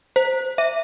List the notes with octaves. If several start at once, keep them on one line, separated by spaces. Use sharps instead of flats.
C5
E5